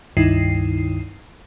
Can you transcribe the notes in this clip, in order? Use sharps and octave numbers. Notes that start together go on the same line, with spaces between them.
C#2 G2 D#3 D#4 E4 C7